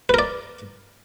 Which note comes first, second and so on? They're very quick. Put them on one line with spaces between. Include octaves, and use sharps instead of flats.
B4 A#4 D5